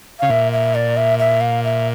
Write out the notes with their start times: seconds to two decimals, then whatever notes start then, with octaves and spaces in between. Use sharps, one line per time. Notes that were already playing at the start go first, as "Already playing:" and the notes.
0.20 C#3 F5
0.30 A#2 E5
0.52 E5
0.75 D5
0.97 E5
1.19 E5
1.41 F5
1.64 E5